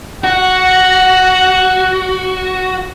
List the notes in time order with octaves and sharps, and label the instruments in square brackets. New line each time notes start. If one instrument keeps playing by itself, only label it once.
[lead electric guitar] F#4 [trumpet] F#5